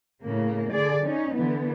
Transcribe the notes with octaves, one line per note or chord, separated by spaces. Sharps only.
A2 C#3 A#3
D3 G#4 D5
C#4 D#4
D3 E3 B3